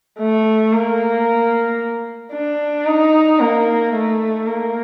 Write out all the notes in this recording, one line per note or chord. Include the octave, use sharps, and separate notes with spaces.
A3
A#3
D4
D#4
A#3
A3
A#3